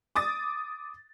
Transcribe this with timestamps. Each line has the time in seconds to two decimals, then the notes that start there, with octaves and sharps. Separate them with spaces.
0.16 D6 D#6 A6